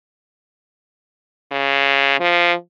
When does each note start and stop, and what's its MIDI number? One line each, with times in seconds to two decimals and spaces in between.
1.52 2.17 49
2.20 2.53 53